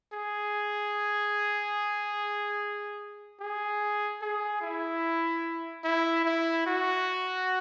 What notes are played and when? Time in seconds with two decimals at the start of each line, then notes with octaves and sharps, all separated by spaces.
0.13 G#4
3.40 G#4
4.21 G#4
4.62 E4
5.84 E4
6.25 E4
6.66 F#4